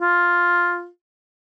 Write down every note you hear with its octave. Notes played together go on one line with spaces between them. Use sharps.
F4